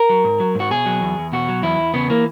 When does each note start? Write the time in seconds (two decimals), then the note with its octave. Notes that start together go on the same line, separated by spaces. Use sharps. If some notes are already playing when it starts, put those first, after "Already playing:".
Already playing: A#4
0.09 F#3
0.24 G#2
0.40 F#3
0.55 G#2 F#4
0.71 B2 G#4
0.86 F#3
1.01 E2
1.18 E2
1.32 B2 F#4
1.48 F#3
1.63 E2 E4
1.79 E2
1.94 C#3 B3
2.10 E3 A#3